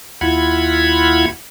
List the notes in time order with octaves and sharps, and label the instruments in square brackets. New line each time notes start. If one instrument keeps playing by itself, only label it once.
[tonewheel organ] D#2 E4 F4 F#5 B5 G#6